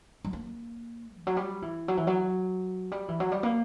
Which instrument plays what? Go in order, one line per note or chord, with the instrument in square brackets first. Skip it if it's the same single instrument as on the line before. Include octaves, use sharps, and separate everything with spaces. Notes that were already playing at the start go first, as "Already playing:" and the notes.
[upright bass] G3
A#3
E3
F#3
G3
E3
F#3
E3
F#3
G3
E3
F#3
G3
A#3